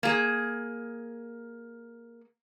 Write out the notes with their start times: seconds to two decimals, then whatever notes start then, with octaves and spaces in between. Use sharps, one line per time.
0.03 A#3 G#4